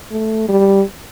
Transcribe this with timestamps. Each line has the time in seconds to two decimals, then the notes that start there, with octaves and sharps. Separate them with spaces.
0.11 A3
0.49 G3